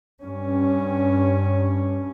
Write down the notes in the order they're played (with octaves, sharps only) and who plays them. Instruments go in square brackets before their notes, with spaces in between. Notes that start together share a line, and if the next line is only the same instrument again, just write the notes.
[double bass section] G2 C#4